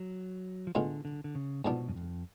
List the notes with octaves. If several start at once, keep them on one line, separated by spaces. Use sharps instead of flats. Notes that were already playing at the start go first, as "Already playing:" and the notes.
Already playing: F#3
F3
A2 D3 G#3 B3 F4
D3
D3
C#3
G#2 B2 F3 B3 D4
F#2
F2